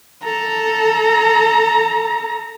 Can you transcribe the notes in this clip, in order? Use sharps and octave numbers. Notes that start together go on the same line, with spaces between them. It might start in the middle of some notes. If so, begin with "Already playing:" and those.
A4 A#5